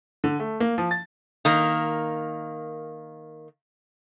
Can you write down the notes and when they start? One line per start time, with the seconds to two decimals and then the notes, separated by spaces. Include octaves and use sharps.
0.24 D3
0.40 A3
0.60 A#3
0.78 F3
0.91 A6
1.45 D#3 A#3